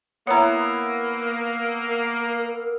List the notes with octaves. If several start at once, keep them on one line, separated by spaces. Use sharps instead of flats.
A#3 B3 E4 C#5 A#5
A#4